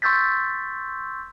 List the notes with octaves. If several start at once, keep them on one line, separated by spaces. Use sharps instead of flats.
C6 C#6 E6 G6 A6 B6